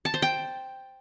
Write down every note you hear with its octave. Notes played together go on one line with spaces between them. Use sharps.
A5
C5
G5